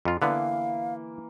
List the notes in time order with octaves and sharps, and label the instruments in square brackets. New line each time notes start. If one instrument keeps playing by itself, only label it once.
[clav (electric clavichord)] F2 F4
[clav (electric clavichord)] D3 B3 [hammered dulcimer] E3 A#3 [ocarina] F5